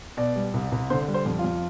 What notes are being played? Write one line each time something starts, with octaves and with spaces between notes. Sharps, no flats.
B2 D5
G3
C2
C2
D3 C5
G3
C5
F2
F4
F2